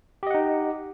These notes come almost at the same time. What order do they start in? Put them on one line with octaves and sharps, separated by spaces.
G4 D#5 F#5 D#4